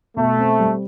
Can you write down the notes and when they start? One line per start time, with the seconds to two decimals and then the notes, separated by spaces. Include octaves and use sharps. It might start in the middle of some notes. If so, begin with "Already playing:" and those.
0.16 B2 A3
0.39 C4
0.59 G3